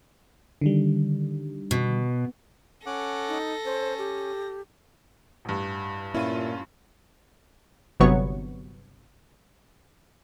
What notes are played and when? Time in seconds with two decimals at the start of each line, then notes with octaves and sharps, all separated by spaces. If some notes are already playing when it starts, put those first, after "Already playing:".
0.61 D3 D#3 G3
1.71 B2
2.86 C#4 A4 F#5 D6 A#6
3.28 D#4
3.65 C#4 C5
3.98 G4
5.45 A1 G2
6.15 A#2 C#4 E4 F4 D#7
8.00 G1 C3 F#3 B3 C#5 C#6